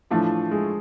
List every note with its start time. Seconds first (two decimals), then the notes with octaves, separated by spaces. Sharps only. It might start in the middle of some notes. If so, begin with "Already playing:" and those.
0.10 A2 E3 F3 A3 D4 F4
0.51 G#3